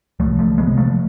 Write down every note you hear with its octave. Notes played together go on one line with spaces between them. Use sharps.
C2 F3 A3
F3 A3
C3 G#3 B3
F3 A3